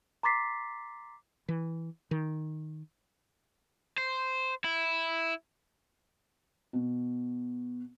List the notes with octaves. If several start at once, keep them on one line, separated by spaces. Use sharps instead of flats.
A#5 C6 D6 A6 B6 C7
E3
D#3
C5
E4
B2